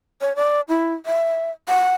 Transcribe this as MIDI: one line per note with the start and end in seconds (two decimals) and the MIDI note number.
0.21 0.33 73
0.36 0.61 74
0.68 0.93 64
1.06 1.51 76
1.68 1.95 78